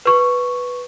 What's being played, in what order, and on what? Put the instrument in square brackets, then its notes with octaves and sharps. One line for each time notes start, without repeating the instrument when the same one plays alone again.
[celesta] B4 C#6